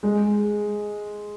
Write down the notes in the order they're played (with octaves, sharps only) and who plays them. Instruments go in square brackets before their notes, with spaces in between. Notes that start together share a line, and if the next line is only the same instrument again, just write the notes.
[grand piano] G#3